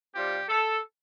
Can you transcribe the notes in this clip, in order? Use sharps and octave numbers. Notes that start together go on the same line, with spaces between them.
C3 G3 C4 F4 G4
A4